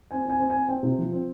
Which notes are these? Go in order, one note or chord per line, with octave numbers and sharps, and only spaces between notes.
C4 G#5
C4 G#5
C4
C4 G#5
C4 G5
C3
F3
C4